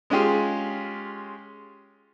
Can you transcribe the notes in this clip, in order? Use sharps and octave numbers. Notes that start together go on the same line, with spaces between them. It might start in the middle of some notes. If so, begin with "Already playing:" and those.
G#3 C#4 F4 G4 G#4